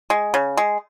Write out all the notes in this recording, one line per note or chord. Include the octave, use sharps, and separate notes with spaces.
G#3
C#3
G#3